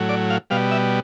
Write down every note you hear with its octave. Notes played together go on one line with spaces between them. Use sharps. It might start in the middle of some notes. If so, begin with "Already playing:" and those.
Already playing: A2 F#3
D5
F5
B2 G3 F5
E5